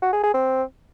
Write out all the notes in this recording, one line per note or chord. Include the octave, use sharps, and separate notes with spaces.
F#4
G#4
G#4
C4